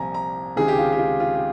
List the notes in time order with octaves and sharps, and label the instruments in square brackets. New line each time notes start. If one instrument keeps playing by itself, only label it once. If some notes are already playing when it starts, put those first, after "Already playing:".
Already playing: [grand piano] C2 A#2 F3 G#5 A#5
A#5
C#2 C3 D#3 G#4
G4
F4
G4
F4
F4
G4